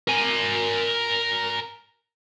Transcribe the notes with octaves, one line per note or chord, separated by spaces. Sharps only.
A#4 G#5